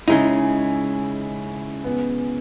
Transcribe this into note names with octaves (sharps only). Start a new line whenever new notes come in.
C#3 G#3 D#4 E4
B3